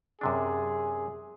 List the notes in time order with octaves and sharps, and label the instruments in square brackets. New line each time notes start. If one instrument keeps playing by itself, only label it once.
[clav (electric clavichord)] F#2 C3 D4 [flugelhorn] G#4